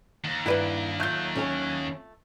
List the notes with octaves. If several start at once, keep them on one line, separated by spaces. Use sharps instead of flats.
D#2
G2 E4 G4 B4 D5 E5 F#5
F#3 A3 F4 G6
C#4 C#5 G#5